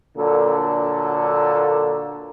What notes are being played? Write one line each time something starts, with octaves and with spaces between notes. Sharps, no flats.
A#2 D3 F#3 A#3 A4